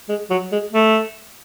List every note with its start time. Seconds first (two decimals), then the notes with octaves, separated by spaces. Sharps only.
0.09 G#3
0.30 F#3
0.52 G#3
0.73 A3